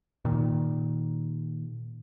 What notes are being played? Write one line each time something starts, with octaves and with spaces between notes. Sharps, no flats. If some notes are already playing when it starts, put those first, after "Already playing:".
A#2 D#3